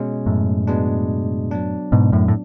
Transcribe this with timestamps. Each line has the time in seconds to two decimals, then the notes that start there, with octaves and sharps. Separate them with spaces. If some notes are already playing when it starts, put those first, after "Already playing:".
Already playing: B2 G#3 C#4
0.26 F#2 A2
0.67 B2 G#3 B3 D4
1.51 F#3 B3 D4
1.92 G#2 B2
2.12 F#2 A2
2.28 A2